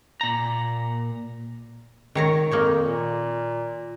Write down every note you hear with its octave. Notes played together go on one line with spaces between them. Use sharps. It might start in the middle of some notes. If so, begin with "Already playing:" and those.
A#2 A#5
D#3 C#5 A#5
F2 A#3 D#4 C#5
A#2